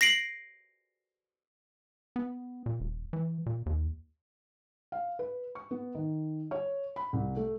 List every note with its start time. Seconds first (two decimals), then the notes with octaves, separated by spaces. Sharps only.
0.01 A#6 C7 D7 F#7
2.16 B3
2.66 A#2
2.80 D#1
3.13 E3
3.46 A#2
3.66 D#2
4.92 F5
5.19 B4
5.55 C#6
5.71 B3
5.95 D#3
6.51 C#5
6.96 B5
7.13 C2
7.36 A3